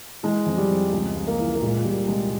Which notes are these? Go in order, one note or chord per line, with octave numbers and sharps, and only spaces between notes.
E3 G#3
F2
G3
F2
C#2 G#3
C#2
A#3
E3
A#3
A#2 G#3
A#2 G3
C2 G#3